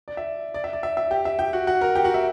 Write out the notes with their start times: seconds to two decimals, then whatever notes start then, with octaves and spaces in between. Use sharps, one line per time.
0.08 D5
0.17 E5
0.54 D5
0.64 E5
0.73 D5
0.83 E5
0.97 E5
1.11 G4 G5
1.25 E5
1.39 G4 G5
1.53 F#4 F#5
1.67 F#4 F#5
1.81 A#4 A#5
1.95 G4 G5
2.04 F#4 F#5
2.14 E5